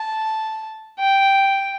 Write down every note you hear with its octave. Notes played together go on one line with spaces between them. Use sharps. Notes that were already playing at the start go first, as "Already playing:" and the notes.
Already playing: A5
G5